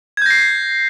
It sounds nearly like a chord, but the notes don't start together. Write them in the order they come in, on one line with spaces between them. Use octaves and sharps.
G#6 G6 A#6 C7